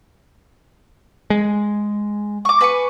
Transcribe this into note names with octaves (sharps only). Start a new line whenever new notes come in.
G#3
C#6 D6
B4 G#5 C#6